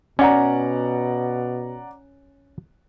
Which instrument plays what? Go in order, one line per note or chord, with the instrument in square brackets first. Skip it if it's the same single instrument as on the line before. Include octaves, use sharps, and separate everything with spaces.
[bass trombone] B2 [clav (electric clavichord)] C#4 [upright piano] D5 F#5 A#5